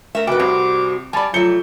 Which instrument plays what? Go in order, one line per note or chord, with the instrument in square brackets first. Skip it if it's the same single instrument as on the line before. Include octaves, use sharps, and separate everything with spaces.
[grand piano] A3 [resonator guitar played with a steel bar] A#4 E5
[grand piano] F1 [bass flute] F#4 [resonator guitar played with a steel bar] B4 G5 [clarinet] D6
[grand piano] C2 C4 [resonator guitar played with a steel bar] G3
[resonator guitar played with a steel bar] G3 D5 [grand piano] G#5 B5 [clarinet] A5
[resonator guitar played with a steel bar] F2 C3 A3 [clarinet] F#3 [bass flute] F4 [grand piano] G6 C#7 G7